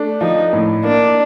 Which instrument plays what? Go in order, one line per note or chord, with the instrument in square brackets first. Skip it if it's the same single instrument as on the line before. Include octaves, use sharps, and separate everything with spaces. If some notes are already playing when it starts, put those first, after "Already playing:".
Already playing: [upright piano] A3 D4
[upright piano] F3 [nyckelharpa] D#4
[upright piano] A2
[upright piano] A#3 [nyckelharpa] D4